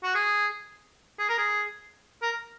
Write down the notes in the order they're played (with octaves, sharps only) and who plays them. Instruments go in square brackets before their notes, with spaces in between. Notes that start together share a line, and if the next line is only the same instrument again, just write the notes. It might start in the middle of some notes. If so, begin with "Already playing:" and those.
[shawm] F#4
G#4
G#4
A#4
G#4
A#4